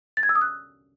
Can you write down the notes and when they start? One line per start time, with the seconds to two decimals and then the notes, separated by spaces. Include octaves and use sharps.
0.17 A6
0.23 G#6
0.29 E6
0.35 D#6
0.42 F#6